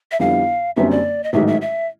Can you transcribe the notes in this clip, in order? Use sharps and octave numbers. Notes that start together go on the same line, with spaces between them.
E5
F2 D3 G3 B3 E4 F5
F#1 F#2 D3 G3 C4 E5
D5
D#5
A1 G#2 D#3 F#3 E5
E5
E5